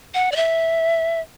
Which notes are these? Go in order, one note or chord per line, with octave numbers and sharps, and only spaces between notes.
F#5
D5
E5